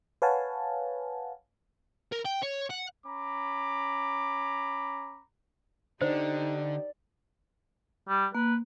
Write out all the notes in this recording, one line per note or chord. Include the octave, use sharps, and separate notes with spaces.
B4 C#5 F5 F#5 G#5 A5
A#4
G5
C#5
F#5
C#4 A#5 B5 D6
D3 D#4 G4 C5 D5
G3
A#3 B4